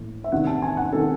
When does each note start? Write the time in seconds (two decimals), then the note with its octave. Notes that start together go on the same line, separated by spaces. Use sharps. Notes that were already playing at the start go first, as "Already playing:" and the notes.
Already playing: A2 E3
0.24 E5
0.32 E2 C3 D#3 F#5
0.47 A5
0.62 G#5
0.77 F#5
0.93 C3 D#3 A4